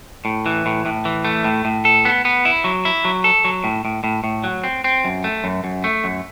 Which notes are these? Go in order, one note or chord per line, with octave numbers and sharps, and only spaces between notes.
A2
E3
A2
A2
E3
A3
A2
A2
A4
B3
B3
E4
F#3
E4
F#3
A4
F#3
A2
A2
A2
A2
F#3
C4
C4
F#2
A3
F#2
F#2
A3
F#2